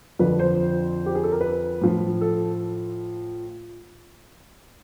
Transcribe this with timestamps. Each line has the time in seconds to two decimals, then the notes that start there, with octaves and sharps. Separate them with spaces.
0.19 F2 D3 F3 B4
0.39 C5
1.06 G4
1.15 G#4
1.24 A4
1.32 A#4
1.41 B4
1.81 A2 F3
2.21 A4